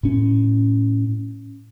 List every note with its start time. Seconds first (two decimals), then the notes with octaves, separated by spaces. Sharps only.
0.03 A2 C#4